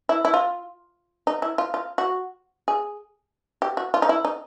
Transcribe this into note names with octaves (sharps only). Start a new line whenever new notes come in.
E4
E4
F4
D#4
E4
F4
F4
F#4
G#4
G4
F#4
F4
D#4
E4
D#4